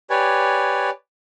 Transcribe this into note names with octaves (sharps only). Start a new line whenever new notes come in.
G4 B4 C#5 D5 G#5